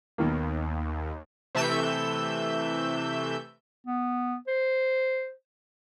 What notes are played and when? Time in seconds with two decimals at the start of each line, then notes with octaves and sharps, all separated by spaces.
0.18 D#2 B2 D#3 A#3
1.55 C3 E3 A3 E5 E6 G6
3.87 B3
4.47 C5